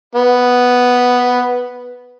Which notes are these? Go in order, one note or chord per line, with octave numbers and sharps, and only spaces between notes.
B3